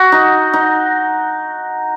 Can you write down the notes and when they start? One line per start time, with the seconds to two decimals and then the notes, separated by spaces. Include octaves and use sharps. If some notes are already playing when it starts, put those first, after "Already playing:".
Already playing: F#4
0.12 D#4
0.54 D#4